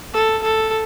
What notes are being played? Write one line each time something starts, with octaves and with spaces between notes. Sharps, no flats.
A4
A4